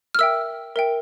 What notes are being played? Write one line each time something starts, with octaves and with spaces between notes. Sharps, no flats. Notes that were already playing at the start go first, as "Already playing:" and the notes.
F6
A#4 E5 G5 E6
A#4 E5 G5